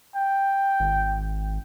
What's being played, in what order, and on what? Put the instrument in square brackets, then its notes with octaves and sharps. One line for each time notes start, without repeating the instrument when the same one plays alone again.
[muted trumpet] G5
[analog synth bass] G#1